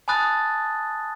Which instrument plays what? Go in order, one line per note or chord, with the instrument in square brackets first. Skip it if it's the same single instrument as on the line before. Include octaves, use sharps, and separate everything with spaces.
[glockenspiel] G#5 A5 B5 D#6 F#6 A6